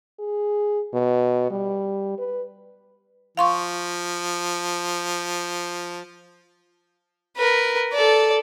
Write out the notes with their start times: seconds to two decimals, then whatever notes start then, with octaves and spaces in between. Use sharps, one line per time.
0.20 G#4
0.94 B2
1.51 G3
2.18 B4
3.37 F3 F5 C6 C#6
7.37 A#4 B4
7.93 A4 D5